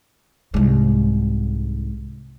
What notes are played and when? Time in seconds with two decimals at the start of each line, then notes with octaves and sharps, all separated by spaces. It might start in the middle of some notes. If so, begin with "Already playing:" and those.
0.54 C2 G#2